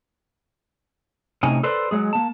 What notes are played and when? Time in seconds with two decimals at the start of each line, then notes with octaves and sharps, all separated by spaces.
1.43 A2 C3 C#4 D#4 G#5
1.63 A4 B4 C5 D5
1.91 F#3 G#3 G#4
2.13 A#3 A5